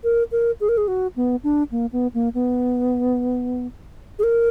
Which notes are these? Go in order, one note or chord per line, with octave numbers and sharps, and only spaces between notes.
A#4
A#4
G#4
A#4
G#4
F#4
B3
D4
A#3
B3
A#3
B3
G#4
A#4